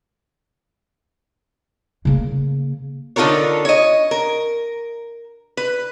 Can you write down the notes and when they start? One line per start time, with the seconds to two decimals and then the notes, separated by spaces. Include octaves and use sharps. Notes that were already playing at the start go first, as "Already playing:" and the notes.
2.05 C#3 A#3
3.16 D3 D#4 F4 A4 A#4 C#5
3.65 C#5 D#5
4.11 A#4
5.57 B4